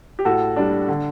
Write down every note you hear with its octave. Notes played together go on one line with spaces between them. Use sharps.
G4
A2 F#4 A4
G3 D4
D3